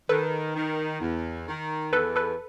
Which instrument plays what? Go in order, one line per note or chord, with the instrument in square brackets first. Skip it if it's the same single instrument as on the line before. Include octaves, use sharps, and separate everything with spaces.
[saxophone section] D#3 [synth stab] A4 B4
[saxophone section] D#3
E2
D#3
[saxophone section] E2 [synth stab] A4 B4
[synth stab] A4 B4